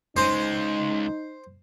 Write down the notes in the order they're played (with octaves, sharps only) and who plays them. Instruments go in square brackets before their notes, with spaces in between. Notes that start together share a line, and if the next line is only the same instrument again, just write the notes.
[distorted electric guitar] C#2 G#3 [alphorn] D#4 [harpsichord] C5